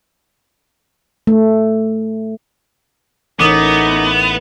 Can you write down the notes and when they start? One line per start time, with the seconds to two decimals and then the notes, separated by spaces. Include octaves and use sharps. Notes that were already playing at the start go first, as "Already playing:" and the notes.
1.27 A3
3.40 A1 B3 D#4 A#4 D6 D#6 A#6